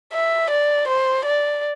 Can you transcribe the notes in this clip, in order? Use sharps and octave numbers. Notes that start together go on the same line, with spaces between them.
E5
D5
C5
D5